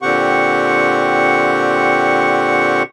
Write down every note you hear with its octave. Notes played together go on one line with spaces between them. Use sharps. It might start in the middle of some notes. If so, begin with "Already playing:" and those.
A#2 D3 C4 G4 F#5 C#6